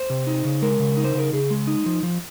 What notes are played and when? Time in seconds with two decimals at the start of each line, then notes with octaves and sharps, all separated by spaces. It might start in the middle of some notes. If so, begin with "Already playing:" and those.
Already playing: C5
0.10 C3
0.27 D#4
0.45 C#3
0.62 G#3 A#4
0.80 C#3
0.97 D#4
1.04 C5
1.15 C#3 A#4
1.33 C#3 G#4
1.50 G#3
1.67 D#4
1.86 F3
2.03 F3